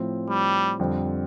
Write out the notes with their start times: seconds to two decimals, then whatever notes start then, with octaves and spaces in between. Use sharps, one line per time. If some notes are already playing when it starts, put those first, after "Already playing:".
Already playing: A2 F3 C4
0.29 G3
0.79 F2 D3 G3 C4